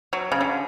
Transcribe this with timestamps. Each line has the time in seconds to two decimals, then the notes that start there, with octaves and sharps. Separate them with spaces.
0.13 F#3
0.32 C#3
0.41 D3